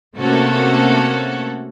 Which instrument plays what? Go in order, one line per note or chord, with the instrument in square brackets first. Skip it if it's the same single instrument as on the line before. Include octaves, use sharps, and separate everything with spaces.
[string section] C3 A3 A#3 C#4 F#4 A4